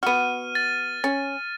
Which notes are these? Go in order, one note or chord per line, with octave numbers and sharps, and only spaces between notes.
B3 F#4 F6 D#7
A6
C#4 A6